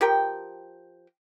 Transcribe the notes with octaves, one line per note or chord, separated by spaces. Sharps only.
F3 G4 A#4 G5